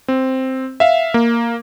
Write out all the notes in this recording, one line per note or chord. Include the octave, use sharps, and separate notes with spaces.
C4
E5 F5
A#3